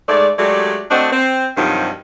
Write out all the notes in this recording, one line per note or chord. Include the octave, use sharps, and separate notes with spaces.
G#2 G#3 A3 D5
F#3 G#3 A3 D4 G4 D5
A3 C4 D4 F#4 D#5
C4
G2 C3 D#3 F3 F#3 D#4